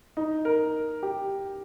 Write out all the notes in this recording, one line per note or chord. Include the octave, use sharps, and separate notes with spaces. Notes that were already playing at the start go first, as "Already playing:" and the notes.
D#4
A#4
G4